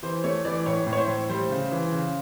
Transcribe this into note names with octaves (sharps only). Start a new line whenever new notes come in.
E3 C5
A3 C#5
E3 D5
A2 C#5
A2
C#5
C5
A2
G3 C5
C#3
E3
C#3